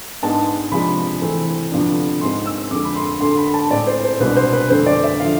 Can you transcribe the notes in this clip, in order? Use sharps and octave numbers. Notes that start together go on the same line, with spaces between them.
G#2 G#3 B3 D4 A5
C3 F3 G#3 D4 B5
C3 E3 A3 C4
D2 C3 F3 B3 D4
G#2 G#3 C4 C6
E6
F2 D3 G#3 D6
B5
C6
D2 D3 A3 C6
B5
A5
A2 G#3 C4 D5
C5
C5
C2 B2 G#3 D4 B4
C5
B4
F2 D3 A3 C4 C5
D5
E5
D3 F3 F5